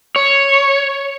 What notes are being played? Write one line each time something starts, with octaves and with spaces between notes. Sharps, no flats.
C#5